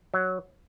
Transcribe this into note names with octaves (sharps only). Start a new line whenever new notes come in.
F#3